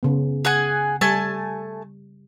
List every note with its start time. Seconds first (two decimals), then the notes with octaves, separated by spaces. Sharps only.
0.03 C#3 B3
0.45 G#4 F#5 G#5
1.01 G3 A3 G#5 A5